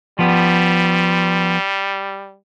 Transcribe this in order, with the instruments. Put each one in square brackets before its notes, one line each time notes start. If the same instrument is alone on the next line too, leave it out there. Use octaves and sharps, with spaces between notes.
[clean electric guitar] F3 B3 [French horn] G3